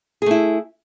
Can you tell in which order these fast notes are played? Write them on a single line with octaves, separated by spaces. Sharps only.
G#4 A3 E4